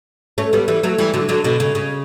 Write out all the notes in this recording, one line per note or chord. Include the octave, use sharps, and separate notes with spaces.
A3 C#4
G3 B3
E3 G3
F#3 A3
E3 G3
D3 F#3
D3 F#3
B2 D3
C#3
C#3